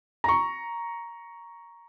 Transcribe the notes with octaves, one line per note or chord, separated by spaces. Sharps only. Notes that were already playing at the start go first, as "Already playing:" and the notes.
A#5 C#6